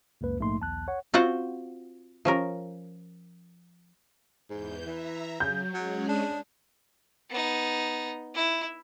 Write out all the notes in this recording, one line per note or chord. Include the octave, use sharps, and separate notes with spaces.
C#2 F#2 A#3 B4
A#1 G#2 A3 A#3 D#4 C6
B1 E2 A5 F#6
C#5 F#5
C4 F4 F#4 C5 F#5
F3 C#4 A#4
E2 G#2 E3 G6
E3 E5 A#5
C#3 F#3 G6
F#3 G#3 C#4 G#4
D4
B3 D#4
E4